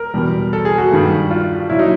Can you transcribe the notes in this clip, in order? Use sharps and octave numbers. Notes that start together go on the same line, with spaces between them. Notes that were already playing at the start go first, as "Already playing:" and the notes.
Already playing: A#4
E2 B2 G3
A4
G#4
F#4
G2 D#3 G3
F4
A#2 F#3 E4
D#4